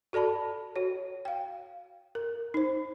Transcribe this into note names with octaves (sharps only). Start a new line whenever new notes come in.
F#4 A4 D5 A5 B5
F#4 C#5
F5 G5
A#4
D#4 C5